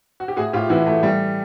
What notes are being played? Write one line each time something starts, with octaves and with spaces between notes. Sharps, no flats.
F#4
G4
A2 F#4 G#4
A2 F4 G4
E3 E4 F#4
A3
G3